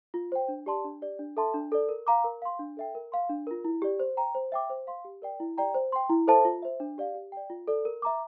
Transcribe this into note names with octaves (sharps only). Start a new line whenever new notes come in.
F4
C5 G5
D4
G4 D5 A5 C6
D4
G4 D5
D4
A4 E5 A5 C6
D4
A4 D5
A#4
F5 A#5 D6
A#4
F5 C6
D4
A4 E5 G5
A#4
F5 C6
D4
F4 A#4
E4
G4 D5
C5
G5 A#5
C5
E5 G5 D6
C5
F5 C6
G4
A#4 D5 G5
E4
G4 D5 G5 A#5
C5
G5 C6
E4
A4 C5 E5 A5
F4
C5 E5
D4
G4 D5 F5
G4
D5 G5
F4
A4 D5
A#4
E5 A#5 D6